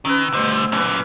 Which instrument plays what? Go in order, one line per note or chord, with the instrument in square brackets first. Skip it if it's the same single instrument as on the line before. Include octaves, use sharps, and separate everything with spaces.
[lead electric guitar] D#3 [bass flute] C#4 [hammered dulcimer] B4 G#5 A#5 [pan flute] E6
[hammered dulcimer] B2 C5 [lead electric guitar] D3 G3 [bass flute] A3
[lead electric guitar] F#2 A#2 [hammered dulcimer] C#4 B4